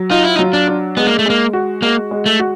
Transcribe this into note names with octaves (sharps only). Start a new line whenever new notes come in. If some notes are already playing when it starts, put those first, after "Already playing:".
Already playing: F#3
D#4 F4
E4
D#4
F#3
D4
D4
G#3 B3
A#3
A3
G#3 A#3
F#4
G#3 A#3
G#3
A3
F#4